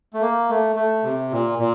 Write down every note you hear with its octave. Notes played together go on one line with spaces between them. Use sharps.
A3
A#3
A3
A3
C3
A#2
A#2